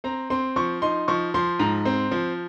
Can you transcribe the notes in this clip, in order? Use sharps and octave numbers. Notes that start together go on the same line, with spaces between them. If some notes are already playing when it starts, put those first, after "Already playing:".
C4 A#5
C4 C6
F3 C#6
D#4 C6
F3 C#6
F3 C6
G#2 A#5
C4
F3